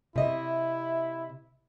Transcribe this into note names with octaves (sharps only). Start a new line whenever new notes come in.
C3 E4 D#5 E5